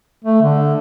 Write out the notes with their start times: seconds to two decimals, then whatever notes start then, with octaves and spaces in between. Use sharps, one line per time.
0.24 A3
0.42 D3